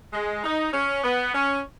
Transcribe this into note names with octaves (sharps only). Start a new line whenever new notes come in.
G#3
D#4
C#4
B3
C#4